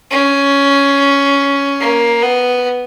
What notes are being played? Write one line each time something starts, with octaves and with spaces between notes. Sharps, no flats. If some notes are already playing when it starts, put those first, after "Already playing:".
C#4
A#3
B3